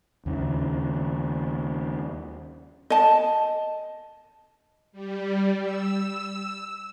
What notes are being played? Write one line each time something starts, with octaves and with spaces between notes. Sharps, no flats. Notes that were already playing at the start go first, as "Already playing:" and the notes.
D#2 C#3
D#5 A5
G3
E6